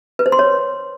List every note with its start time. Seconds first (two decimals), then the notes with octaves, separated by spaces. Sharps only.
0.19 B4
0.26 C5
0.32 C6
0.39 C#5